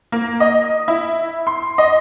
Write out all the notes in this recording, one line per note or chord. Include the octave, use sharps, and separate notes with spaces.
A#3
D#5
E4
C6
D#5